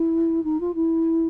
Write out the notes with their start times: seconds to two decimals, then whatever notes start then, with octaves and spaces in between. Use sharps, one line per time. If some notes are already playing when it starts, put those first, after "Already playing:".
Already playing: E4
0.44 D#4
0.60 F4
0.75 E4